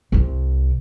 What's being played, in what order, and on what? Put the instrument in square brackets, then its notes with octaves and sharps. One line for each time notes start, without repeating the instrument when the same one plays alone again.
[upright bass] C2 C3